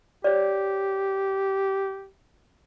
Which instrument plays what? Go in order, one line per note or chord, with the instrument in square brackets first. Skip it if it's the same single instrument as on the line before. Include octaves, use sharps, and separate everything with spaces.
[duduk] G4 [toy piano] C#5 D5